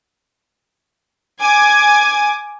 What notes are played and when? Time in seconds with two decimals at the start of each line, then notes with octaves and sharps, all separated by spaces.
1.40 G#5 D6 G#6